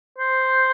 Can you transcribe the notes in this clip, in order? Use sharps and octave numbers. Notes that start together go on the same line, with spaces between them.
C5